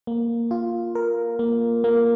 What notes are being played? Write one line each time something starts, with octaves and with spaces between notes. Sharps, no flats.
A#3
F4
A#4
A#3
A#3